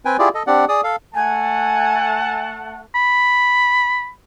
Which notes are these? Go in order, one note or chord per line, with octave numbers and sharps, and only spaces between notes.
C4 B4 G5 G#5
E4 F4 G4 G#4 D5
A4 D#5
C4 D4 G4 D5 F#5
G#4 D5 D#6
A4 F5
A3 F#5 G#5 A5
B5